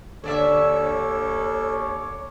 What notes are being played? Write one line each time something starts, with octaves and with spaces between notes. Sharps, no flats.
D#2 D3 A4 C#5 D5 E5 D6